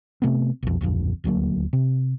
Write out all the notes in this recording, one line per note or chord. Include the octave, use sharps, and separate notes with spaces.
C3 A3 B3 C4
B1 F2
D1 A#1 F2
D#1 D2 F#3 A#3
C3